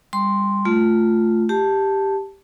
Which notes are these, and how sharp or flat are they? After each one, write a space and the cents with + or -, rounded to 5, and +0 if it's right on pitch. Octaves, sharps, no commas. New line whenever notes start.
G3 +25 C6 +0
A3 +0 F4 +0
G4 +0 A5 +0